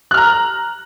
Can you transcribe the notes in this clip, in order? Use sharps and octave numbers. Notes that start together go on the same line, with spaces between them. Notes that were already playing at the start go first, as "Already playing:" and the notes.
A#5 F6 F#6